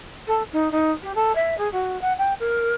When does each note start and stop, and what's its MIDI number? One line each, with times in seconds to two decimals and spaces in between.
0.27 0.42 69
0.52 0.68 63
0.71 0.90 63
1.02 1.12 67
1.15 1.34 69
1.35 1.54 76
1.57 1.70 68
1.72 2.00 66
2.01 2.13 78
2.18 2.33 79
2.39 2.73 70